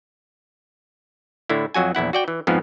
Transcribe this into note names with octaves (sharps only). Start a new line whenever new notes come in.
A2 D3 E4
F2 F#3 F#4 G#5
A#1 E2 E4 F#5
F#4 D5 G5
E3
F2 G#2 F3 B3